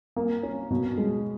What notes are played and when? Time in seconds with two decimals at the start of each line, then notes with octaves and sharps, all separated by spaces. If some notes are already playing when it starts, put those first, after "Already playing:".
0.16 A#3
0.43 C#4
0.71 B2
0.98 G#3